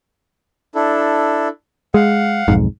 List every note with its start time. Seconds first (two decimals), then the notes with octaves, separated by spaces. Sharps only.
0.75 D4 E4 A4
1.94 G#3 F5 F#5
2.48 B1 F2 G#2